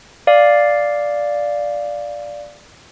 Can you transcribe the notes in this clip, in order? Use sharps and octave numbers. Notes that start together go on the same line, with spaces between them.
D5 F5